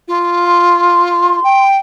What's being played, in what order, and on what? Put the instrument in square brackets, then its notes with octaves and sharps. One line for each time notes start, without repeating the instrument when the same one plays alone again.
[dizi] F4
[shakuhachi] C6
[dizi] G5